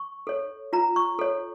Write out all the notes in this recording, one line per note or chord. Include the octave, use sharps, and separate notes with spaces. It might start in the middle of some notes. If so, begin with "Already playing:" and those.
Already playing: C#6
A4 C#5
F4 A#5
C#6
A4 C#5